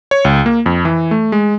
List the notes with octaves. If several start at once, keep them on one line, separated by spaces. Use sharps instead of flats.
C#5
C#2
A#3
F2
E3
A3
G#3